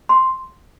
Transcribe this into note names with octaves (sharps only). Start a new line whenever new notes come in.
C6